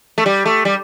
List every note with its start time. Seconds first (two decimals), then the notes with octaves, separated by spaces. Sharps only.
0.18 A3
0.26 G3
0.46 A3
0.65 G3